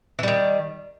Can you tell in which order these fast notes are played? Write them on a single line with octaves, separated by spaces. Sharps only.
E3 G3 D#3